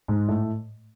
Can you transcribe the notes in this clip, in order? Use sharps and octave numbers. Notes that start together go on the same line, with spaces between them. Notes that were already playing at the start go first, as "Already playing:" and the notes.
G#2 G#3
A2 A3